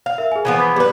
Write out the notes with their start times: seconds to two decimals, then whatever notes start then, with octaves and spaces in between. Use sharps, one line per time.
0.06 F5
0.18 A#4 E5
0.32 G#4 G#5
0.45 E3 F3 B3
0.58 B5 G#6 B6
0.76 G3 B4